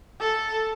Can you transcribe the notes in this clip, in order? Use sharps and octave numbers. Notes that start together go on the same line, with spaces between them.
A4